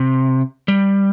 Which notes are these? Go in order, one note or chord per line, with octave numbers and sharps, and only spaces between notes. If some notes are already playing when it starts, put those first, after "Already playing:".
Already playing: C3
G3